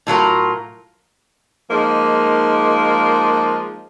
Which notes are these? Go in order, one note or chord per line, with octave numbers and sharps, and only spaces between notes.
A2 F#3 F4 A#4
F3 G#3 A#3 D#4